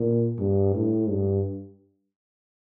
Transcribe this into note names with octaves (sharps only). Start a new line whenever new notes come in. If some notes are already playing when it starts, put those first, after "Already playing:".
Already playing: A#2
G2
A2
G2